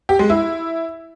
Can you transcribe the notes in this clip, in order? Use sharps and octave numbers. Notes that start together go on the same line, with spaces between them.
G4
G#3
E4